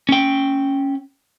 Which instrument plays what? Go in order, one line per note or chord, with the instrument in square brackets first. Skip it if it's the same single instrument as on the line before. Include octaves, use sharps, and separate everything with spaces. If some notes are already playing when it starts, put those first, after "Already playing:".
[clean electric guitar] C#4 G5